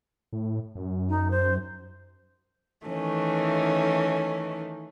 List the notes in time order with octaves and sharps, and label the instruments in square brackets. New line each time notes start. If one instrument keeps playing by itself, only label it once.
[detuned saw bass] A2
F#2
[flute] D#4
C5
[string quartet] D#3 E3 A3 C#4